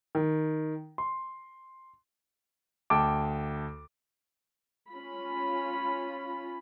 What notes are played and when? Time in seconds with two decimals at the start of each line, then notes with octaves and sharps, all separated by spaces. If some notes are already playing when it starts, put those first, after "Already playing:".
0.15 D#3
0.98 C6
2.90 D2 G5 A5 D6
4.90 C#4 F4 B5